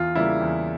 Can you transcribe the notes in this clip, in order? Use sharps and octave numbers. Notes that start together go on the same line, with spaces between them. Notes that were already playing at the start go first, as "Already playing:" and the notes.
Already playing: E2 F4
C#3 G3 A#3 E4
E2